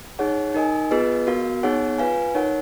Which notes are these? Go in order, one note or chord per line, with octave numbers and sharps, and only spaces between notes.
D#4 G#4 C#5 F#5
D#4 A#4 D#5 G#5
B3 F4 G#4 B4 D#5
B3 F#4 A#4 F5
B3 D#4 G#4 C#5 F#5
F4 B4 F5 G#5
D#4 A#4 C#5 F#5